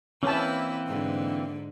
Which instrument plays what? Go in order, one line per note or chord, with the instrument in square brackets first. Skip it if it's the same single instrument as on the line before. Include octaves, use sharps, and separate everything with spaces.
[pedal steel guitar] E3 A#3 C4 [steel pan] C#4 A5 [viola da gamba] E4 B4
[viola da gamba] G#2 D3